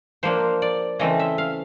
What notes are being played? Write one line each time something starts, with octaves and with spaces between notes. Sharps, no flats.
F3 A#3 D4 C5
D5
C#3 E3 A3 C4 D#5
E5
F5